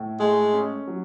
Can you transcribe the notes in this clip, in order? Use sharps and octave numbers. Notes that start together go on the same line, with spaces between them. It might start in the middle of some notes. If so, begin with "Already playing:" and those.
Already playing: A2
G#3 A3
C#4
F#3